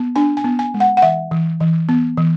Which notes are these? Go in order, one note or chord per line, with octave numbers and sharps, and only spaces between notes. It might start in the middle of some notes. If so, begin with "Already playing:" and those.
Already playing: B3
D4 G#5
G#5
B3
G#5
G#3
F#5
F#5
E3 E5
E3
E3
B3
E3